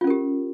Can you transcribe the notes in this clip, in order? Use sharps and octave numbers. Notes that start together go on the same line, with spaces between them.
C#4 F4 G4 A#4